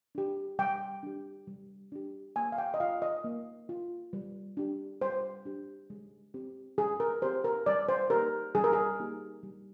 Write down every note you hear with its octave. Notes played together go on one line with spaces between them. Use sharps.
D4 G4
G3 G5
D4 G4
G3
D4 G4
A#3 G#5
F5
G5
D#5
F4 F5
D#5
A#3
F4
G3
D4 G4
G3 C5
D4 G4
G#3
C4 G4
G#3 G#4
A#4
C4 G4 C5
A#4
G3 D5
C5
A#3 D#4 G4 A#4
G3 G#4
A#4
G#4
A#3 D#4 G4
G3